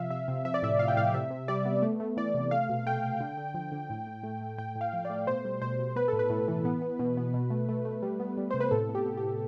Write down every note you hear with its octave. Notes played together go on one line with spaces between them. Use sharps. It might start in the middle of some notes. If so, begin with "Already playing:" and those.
Already playing: C3 F3 E5 F5
C3 E5
C3
F3 E5
D5
A2 E5
F3 F5
G5
A2 F5
C3 E5
C3
G3 D5
B3
A3
A3
E3 D5
C3
A3 F5
B2
A3 G5
B2
D3
D3
F3
D3
A2
A2
A3
A3
A2 G5
A2
F5
F3
D5
A3
B2 C5
G3
B2 C5
B2
B3 B4
A2 A4
B4
A2
E3
B3
B3
B2
B3
B2
A3
A3
A3
G3
B3
G3
C3 C5
B4
A2 A4
B3
G4
B3
G4
A2